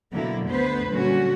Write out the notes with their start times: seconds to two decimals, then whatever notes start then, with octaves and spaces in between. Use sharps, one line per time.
0.13 B2 D3 F#3 A#3 E4
0.49 D2 B3 B4 C5
0.91 A#2 D3 F#3 G3 C#4 F#4